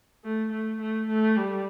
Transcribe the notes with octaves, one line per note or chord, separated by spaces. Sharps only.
A3
A3
A3
A3
G3